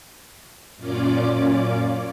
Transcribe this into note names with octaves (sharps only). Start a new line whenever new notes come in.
F#2 A#2 C#4 F4 D5 D6